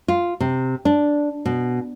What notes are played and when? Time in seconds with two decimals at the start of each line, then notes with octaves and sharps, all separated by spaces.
0.08 F4
0.40 C3
0.85 D4
1.45 B2